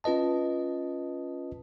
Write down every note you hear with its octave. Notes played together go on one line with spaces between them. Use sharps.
C#4 F4 B4 D#5 A5